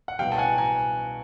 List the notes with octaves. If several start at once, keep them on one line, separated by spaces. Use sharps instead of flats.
F#5
C2 B2 F#3 F5 G5
A5
F#5 G#5
G#5 A#5